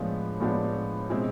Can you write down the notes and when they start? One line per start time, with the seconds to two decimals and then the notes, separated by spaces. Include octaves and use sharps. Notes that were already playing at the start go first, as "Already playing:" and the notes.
Already playing: A2 F3 G#3 B3 D4
0.40 A2 F3 G#3 B3 D4
1.10 B2 G#3 C4 E4